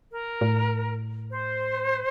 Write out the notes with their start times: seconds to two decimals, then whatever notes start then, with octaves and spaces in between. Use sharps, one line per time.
0.11 A#4
0.41 A2
1.32 C5